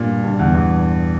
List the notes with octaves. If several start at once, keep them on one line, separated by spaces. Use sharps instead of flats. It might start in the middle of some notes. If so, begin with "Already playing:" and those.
Already playing: G2 A#2
G2
E2
E2